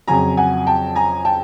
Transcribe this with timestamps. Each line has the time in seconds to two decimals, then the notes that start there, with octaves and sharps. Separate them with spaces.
0.08 F2 C#3 F#3 G#5 A#5
0.37 F#5 G#5
0.67 G5 A5
0.95 G#5 A#5
1.25 G5 A5